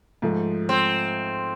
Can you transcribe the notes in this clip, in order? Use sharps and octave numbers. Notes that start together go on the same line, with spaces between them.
G#2 F3 A3
C4